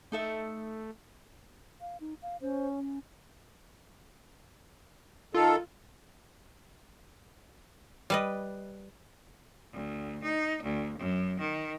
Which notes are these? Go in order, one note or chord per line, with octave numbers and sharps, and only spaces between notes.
A3 D#4 A4 E5
F5
D#4
F5
C#4 C5
C#4
D#3 F4 A4
G3 B4 D#5
D2
D#4
D2
F#2
D#3